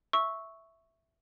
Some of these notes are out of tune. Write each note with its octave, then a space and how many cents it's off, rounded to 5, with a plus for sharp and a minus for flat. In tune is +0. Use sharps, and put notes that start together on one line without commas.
E5 +0 C#6 +0 E6 -10